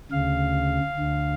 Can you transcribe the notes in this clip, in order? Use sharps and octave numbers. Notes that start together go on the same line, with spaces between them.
D2 C#3 F5
D2 D3